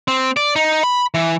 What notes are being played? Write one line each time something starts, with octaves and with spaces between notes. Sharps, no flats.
C4
D5
D#4
B5
E3